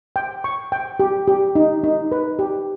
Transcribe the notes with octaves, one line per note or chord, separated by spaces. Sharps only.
G5
C#6
G5
G4
G4
D#4
D#4
B4
G4